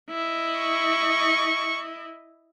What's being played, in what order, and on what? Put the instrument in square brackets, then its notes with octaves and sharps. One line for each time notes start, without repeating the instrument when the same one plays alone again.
[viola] E4 D#5
[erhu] C#6